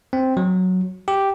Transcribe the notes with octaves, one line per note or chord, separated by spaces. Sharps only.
C4
F#3
G4